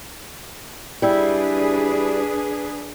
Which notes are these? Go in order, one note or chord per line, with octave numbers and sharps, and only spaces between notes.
G3 D4 E4 G#4 B4